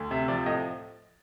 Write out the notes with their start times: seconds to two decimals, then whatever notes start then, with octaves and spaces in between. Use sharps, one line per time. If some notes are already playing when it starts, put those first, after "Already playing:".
Already playing: D2
0.11 C3 E5
0.28 F3 D5
0.46 A2 D#5